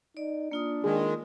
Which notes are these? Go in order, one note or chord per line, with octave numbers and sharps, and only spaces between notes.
D#4 D5
A#3 D4 F4 D#6
D#3 G#3 G#4